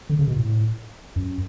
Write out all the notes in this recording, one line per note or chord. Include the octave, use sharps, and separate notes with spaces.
D3
C#3
B2
A2
F#2